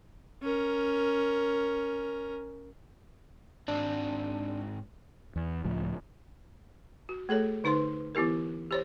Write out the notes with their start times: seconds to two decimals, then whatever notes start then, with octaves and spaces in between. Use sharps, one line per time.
0.42 C#4 A#4
3.68 G#2 C4 D4
5.36 E2
5.65 C#2 A2 F3
7.09 F#4
7.29 A3 G#4 A4 C#5
7.64 D3 D#4 B4 C5 C6
8.15 E3 B3 E4 G4 A#4
8.71 G4 C5 C#5